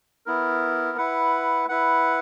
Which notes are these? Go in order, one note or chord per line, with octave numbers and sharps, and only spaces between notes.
B3 E4 A#4
E4 B4 F#5
E4 B4 F#5